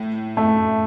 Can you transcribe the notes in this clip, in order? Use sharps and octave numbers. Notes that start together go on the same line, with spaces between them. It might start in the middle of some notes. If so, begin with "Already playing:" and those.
Already playing: A2
A3